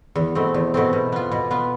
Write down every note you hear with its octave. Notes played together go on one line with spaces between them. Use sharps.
E2
B2 A3 C4
E2
B2 A3 C4
B2
B3 F4
B2
B3 F4